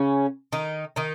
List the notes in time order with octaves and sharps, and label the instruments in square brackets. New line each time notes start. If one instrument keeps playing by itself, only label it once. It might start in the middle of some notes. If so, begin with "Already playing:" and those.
Already playing: [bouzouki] C#3 C#4
D#3 D#4
D#3 D#4